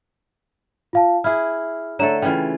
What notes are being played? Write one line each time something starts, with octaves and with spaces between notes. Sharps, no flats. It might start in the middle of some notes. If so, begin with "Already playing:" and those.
F4 F5 A5
E4 G#4 E5 F6
D3 A3 A4 C#5 A#5 E7
C#3 E3 F4 G5